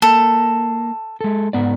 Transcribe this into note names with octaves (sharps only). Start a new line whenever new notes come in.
A#3 A4
G#3 A4
G#2 B3 D5